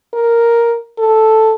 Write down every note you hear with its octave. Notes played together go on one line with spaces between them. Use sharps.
A#4
A4